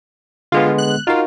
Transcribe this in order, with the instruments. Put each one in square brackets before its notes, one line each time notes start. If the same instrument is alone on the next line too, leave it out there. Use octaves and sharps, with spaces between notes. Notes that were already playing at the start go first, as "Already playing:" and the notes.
[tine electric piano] D3 G#3 B3 [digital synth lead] F4
[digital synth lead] F#6
[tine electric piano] D#4 F#4 A#4 [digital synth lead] F4